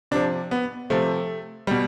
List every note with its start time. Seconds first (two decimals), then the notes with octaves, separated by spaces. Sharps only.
0.11 C3 F3 D4
0.51 B3
0.90 C3 F3 A3
1.67 B2 G3